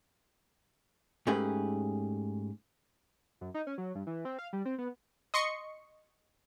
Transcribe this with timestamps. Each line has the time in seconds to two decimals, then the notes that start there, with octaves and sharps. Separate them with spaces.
1.27 G#2 A3 C#4 G4 G#4 B4
3.41 F#2
3.54 D#4
3.67 C#4
3.78 F#3
3.95 G2
4.07 E3
4.25 C4
4.39 F5
4.53 G3
4.65 C4
4.78 B3
5.34 D#5 C6 C#6 C#7